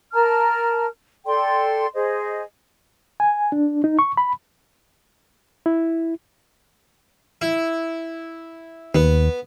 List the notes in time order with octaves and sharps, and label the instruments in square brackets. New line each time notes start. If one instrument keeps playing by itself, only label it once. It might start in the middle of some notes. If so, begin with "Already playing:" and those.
[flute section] A#4 A5 A#5 F6
A4 D5 G5 C6
G#4 C5 D#5
[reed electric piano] G#5
D4
D#4
C#6
B5
E4
[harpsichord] E4
[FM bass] D#2 [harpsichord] B3